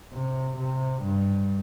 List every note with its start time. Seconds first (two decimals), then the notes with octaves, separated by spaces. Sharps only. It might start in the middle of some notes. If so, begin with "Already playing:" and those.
0.13 C3
0.58 C3
1.02 G2